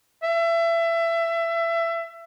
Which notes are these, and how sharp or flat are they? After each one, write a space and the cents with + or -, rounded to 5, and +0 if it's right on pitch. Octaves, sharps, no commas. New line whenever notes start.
E5 +25